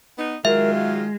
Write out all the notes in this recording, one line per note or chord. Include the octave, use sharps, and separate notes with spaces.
B3 D#4
D#3 F#3 G#3 F4 A#4 E5
F5